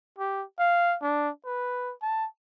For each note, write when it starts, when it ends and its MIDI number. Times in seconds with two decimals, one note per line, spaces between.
0.19 0.44 67
0.59 0.96 77
1.02 1.30 62
1.46 1.93 71
2.02 2.27 81